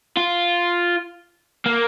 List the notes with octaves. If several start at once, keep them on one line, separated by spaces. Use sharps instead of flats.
F4
A#3